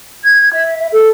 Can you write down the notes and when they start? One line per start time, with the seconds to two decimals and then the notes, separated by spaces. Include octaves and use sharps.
0.24 G#6
0.53 E5
0.79 E5
0.92 A4